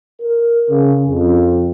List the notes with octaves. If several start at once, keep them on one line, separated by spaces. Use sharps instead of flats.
A#4
C#3
F2